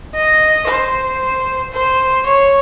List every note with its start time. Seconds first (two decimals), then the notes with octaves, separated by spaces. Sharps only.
0.15 D#5
0.68 C5
1.73 C5
2.26 C#5